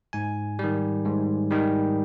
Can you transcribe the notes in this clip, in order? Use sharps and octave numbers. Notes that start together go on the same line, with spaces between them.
G#2 G#5
D#3 G3
G#2
D#3 G3